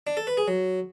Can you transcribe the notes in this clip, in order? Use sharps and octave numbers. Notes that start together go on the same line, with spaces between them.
D4
A4
B4
G#4
F#3